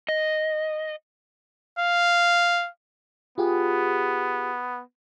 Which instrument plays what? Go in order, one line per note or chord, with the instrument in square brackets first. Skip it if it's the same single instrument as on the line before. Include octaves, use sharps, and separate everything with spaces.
[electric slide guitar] D#5
[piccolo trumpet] F5
[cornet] B3 [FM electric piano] F4 G4 G#4